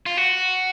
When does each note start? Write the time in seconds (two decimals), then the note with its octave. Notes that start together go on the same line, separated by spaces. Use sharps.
0.06 F4
0.17 F#4